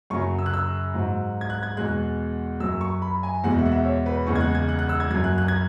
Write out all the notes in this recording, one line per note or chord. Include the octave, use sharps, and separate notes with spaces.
F#2 C#3 F#3 C#6
E6
F#6
E6
G#2 F#3
G#6
F#6
G#6
E2 B2 G#3 F#6
F#2 F#3 E6
C#6
B5
G#5
E2 B2 G#3 F#5
E5
F#5
E5
C#5
B4
E2 C#3 G#3 C#6
G#6
F#6
G#6
F#6
F#6
E6
G#6
F#2 F#3 G#6
F#6
F#6
G#6